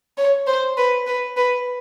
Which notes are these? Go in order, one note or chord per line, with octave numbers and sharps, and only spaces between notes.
C#5
C5
B4
B4
B4